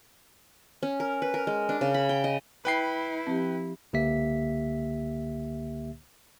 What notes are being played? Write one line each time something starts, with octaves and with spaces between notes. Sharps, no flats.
C#4
A#4
B4
A#4
G#3
D4
C#3
B5
G5
D#5
E4 B4 G5 C7
F3 C4 G4
C#2 D3 A#3 G4 E5 B6